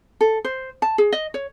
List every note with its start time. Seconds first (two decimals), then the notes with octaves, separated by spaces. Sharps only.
0.21 A4
0.44 C5
0.82 A5
0.98 G#4
1.12 D#5
1.34 C#5